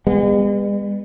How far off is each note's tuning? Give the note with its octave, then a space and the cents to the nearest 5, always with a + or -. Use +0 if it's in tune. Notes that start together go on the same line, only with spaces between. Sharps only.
G#3 -45 B3 +0